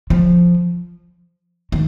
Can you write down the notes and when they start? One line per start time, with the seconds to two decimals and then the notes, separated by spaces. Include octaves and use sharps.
0.10 F3
1.72 D#3